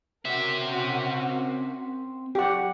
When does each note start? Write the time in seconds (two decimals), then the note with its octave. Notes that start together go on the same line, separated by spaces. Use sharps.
0.25 C4 C#4 F#4 A#4 E5
2.35 F#3 G4 F#5